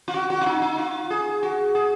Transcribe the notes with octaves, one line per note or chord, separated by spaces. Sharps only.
F4
F#4
F#4
F4
D#4
D#4
F4
G#4
F#4
G#4